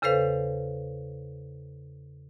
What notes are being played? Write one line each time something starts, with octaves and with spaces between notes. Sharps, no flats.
E2 C#3 A4 B4 C5 F5